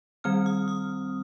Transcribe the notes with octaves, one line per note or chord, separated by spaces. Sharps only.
D#3 G3 C4 F6
D#6
D#6